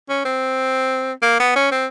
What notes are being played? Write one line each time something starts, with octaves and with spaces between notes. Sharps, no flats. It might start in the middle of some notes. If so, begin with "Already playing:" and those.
C#4
C4
A#3
B3
C#4
C4